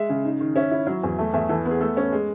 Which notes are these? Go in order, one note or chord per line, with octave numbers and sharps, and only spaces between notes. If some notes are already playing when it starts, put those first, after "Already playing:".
Already playing: G#3 E5
C#3
D#4
D#3
C#4 E5
E4
F#3
E2
A3
E2 E5
E3 A4
B3
G#4
A3 A4
C#4
G#3